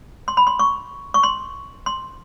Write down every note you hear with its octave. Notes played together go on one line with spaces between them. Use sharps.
C6
B5
C6
C#6
C#6
C6
C6